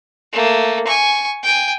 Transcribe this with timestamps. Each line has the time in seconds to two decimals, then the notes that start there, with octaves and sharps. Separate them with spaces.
0.32 A3 A#3
0.87 G#5 C#6
1.43 G5 G#5